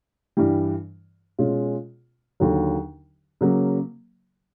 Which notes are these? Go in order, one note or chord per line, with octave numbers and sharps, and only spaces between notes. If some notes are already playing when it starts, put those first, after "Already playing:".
G2 E3 G3
B2 G#3 C#4 F4
D#2 D3 F#3
C#3 F#3 A#3